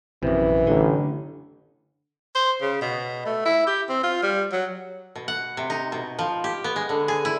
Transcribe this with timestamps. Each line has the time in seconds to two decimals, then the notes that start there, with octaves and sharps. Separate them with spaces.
0.23 A#1 F#2 C3 E3
0.67 A1 D3
2.35 C5
2.61 C#3
2.81 B2
3.26 A3
3.45 E4
3.67 G4
3.89 C4
4.03 F4
4.23 G3
4.52 F#3
5.16 B2
5.28 F#5
5.57 C3
5.70 D#4
5.92 B2
6.19 F3
6.44 G4
6.64 B3
6.76 G#3
6.89 D3
7.08 G#4
7.25 E4